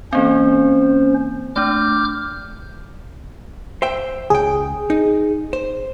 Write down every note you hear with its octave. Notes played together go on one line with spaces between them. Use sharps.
E3 A#3 C4 C#4 C5
A3 D4 D6 F6 G6
C5 E5 G5
C#2 G#4 G5
D#4
C5